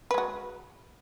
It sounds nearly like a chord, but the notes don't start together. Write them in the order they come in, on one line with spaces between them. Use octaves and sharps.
B4 G#3 F#4